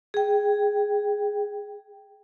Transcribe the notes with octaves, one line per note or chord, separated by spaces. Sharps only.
G#4 G5